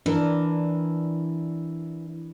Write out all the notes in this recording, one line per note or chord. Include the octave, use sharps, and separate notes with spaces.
E3 D4 A#4